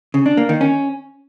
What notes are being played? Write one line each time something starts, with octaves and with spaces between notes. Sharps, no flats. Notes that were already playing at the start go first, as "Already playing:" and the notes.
C#3
D4
A#3
D#3
C#4